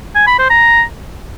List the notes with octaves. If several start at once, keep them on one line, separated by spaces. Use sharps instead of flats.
G#5
B5
C5
A#5